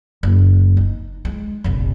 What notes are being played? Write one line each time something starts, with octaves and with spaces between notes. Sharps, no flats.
F#1
D#4
G#3
F1 A#1